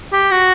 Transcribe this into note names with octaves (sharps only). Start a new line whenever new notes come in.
G4
F#4